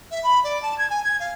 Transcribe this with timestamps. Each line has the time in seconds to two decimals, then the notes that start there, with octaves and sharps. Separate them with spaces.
0.11 E5
0.23 B5
0.44 D5
0.62 A5
0.78 G#6
0.90 G#5
1.04 G#6
1.20 F5